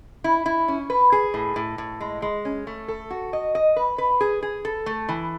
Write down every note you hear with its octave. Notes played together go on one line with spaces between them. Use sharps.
E4
E4
C#4
B4
G#4
A2
A2
A2
G#3
G#3
C#4
A3
A4
F#4
D#5
D#5
B4
B4
G#4
G#4
A4
A3
E3